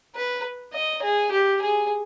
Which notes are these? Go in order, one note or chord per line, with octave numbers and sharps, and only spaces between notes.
B4
D#5
G#4
G4
G#4